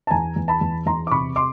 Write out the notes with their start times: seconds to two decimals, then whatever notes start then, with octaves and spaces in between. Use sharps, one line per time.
0.07 A5
0.11 E2 G#5 A#5
0.36 E2
0.48 A5 B5
0.61 E2
0.86 E2 A#5 C6
1.07 D6
1.11 C3 B5 C#6
1.36 C6 D6